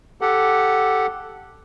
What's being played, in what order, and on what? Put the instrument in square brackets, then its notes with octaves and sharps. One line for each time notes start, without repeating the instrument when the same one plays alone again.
[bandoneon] G4 A4 F#5